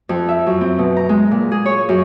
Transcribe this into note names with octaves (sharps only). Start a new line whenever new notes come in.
F2
E5
F#2
C4
B2
A#5
G#3
A#2
G#4
C#5
F#2